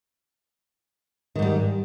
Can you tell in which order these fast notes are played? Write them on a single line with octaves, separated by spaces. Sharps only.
D#3 G#2 G3